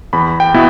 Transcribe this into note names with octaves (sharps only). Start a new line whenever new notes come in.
E2 B5
G5
B2 B3 E4